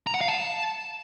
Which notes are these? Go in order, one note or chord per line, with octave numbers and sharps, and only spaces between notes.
A#5
F#5
F5
A5